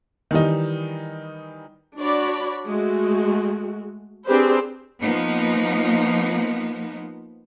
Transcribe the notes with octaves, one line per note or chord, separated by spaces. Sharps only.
D#3 E3 G3 D#4
D4 F#4 C#5 D5 B5
G#3 A3 F#4
C4 D4 G4 G#4 B4 C5
F3 A#3 B3 D#4